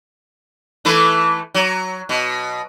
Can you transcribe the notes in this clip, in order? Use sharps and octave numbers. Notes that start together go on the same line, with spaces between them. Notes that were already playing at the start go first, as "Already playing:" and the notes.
E3 A3 B4
F#3
B2